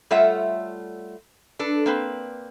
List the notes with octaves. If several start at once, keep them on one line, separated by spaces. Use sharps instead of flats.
G3 A3 F4 C#5 E5 F#5
D4 A4 B4
A#3 C4 B4